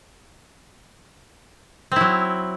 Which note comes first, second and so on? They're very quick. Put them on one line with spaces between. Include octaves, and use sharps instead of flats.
C4 E4 F#3